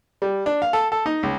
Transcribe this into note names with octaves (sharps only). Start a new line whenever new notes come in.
G3
D4
F5
A4
A4
D#4
C#2